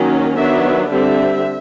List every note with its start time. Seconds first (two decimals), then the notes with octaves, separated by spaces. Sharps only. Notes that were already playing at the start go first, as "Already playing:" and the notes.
Already playing: D#3 F#3 A#3 C#4
0.36 D#3 F#3 B3 D4 E5
0.88 D3 G3 C4 E5